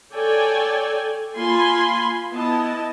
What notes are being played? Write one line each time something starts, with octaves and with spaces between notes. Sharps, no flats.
A4 C#5 D5 G5 G#5
A#3 F4 G#5 B5 C6
B3 E4 D#5 A5